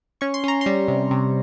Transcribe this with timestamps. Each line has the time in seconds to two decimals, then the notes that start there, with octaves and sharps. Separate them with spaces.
0.21 C#4 C#6
0.34 C6
0.44 C#4 A#5
0.61 G3 C6
0.88 C3
1.11 C3